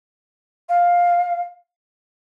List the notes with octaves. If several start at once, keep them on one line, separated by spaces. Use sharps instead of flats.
F5